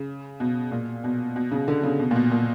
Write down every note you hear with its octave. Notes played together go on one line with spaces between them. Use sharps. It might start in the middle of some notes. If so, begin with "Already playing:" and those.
Already playing: C#3
B2
A#2
B2
B2
C#3
D3
C#3
B2
A#2
B2
A#2